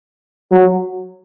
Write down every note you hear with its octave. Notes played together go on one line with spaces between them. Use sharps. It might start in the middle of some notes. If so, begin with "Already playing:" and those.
F#3